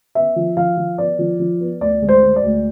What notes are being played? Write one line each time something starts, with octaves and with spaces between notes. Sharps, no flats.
B3 E5
F3
F3 F5
F3
B3 D5
F3
F3
B3
D2 D5
G#3
C5
G#3
D5
D2